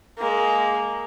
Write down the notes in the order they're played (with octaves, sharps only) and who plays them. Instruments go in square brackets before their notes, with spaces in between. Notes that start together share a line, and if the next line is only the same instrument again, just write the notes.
[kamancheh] G#3 A#3